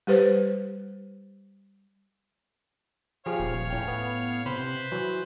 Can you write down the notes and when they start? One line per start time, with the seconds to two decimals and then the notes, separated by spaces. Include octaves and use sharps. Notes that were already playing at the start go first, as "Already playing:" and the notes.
0.07 G3 G4 B4 C5
3.26 F3 G4 G#4 C#5 F5
3.40 D#1
3.70 A2 C#4 G5
3.88 B3
4.46 C3 B4 C5 B5
4.92 E3 F#3